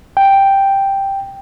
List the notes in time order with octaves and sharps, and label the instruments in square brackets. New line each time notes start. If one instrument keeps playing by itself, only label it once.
[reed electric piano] G5